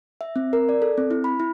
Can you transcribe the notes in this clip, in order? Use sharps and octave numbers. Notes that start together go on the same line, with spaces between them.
E5
C4
A#4
D5
A4
C4
E4
B5
E4